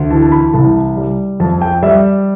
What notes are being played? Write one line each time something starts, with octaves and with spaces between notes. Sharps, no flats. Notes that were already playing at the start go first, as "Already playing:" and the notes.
Already playing: D2
E3 A5
A5
B5
C2 A5
G3
F2 A5
G5
G3 E5